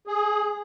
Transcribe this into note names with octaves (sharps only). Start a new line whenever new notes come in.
G#4